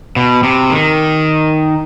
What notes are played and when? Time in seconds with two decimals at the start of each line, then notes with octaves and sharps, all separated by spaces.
0.16 B2
0.43 C3
0.70 D#3